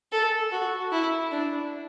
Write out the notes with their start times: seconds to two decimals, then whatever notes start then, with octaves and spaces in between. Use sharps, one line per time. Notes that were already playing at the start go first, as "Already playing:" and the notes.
0.12 A4
0.52 F#4
0.92 E4
1.32 D4